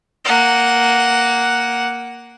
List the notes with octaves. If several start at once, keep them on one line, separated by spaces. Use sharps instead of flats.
A#3 F#5